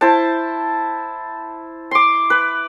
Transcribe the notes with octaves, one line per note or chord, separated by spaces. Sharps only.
E4 C5 A5
C6 D6
B4